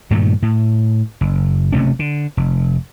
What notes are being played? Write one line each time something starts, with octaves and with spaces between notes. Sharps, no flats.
G2 A#2 D#3 A3
A2
F#1
F#1 C3 A3 C#4
D3
F1